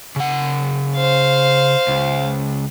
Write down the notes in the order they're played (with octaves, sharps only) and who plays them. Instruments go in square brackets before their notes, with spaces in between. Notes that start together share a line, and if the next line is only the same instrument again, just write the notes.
[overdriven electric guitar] C#3 F#5
[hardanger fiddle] C5 F5
[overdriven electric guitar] C#2